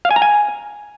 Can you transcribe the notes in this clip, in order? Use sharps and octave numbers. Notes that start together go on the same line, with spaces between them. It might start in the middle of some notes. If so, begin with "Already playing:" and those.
F5
G#5
A#5
G#5